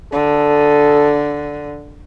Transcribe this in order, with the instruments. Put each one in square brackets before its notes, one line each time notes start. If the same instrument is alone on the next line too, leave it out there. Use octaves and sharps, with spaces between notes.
[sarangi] D3 [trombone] A4